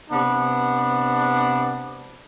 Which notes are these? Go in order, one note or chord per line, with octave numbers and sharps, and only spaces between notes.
C3 B3 D4